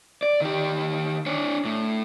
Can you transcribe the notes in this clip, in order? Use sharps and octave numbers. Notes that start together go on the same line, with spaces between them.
D5
D#3 G4
D4 C#5
A2